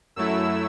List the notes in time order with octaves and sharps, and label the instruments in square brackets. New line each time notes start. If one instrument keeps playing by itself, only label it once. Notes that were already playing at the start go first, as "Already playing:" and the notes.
[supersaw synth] F#2 F#3 A3 E4 E6